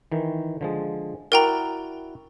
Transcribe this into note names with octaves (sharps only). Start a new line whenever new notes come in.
D#3 E3
D3 F3 G#3
E4 F#4 A#4 D5 G5 A#5